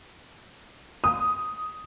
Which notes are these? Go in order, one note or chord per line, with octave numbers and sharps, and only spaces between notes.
D#6